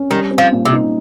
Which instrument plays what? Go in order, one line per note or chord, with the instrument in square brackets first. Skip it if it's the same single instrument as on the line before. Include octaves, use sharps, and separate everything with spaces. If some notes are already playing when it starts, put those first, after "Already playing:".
Already playing: [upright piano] C#4
[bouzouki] D#3 [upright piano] G3
[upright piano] C4
[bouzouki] F3
[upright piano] A#2
[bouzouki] C3
[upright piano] D#4